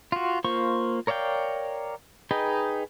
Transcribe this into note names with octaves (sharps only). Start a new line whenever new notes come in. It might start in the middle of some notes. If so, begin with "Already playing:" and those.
F4 F#4
A#3 F4 C5 C#6
A#4 C#5 D5 F5 G5
D#4 G#4 B4 D#5 G5